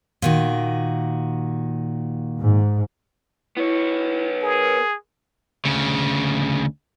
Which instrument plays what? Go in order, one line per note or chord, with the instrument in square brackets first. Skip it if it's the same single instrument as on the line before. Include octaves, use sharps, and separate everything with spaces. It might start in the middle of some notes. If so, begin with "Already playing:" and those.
[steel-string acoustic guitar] A#2 D#3 F#4
[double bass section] G#2
[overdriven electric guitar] B3 C#5 [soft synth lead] E4
[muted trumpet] G#4 [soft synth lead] A#4
[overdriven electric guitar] D2 C#3